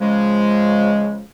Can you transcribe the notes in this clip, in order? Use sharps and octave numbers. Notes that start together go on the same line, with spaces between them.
C#3 F3 G#3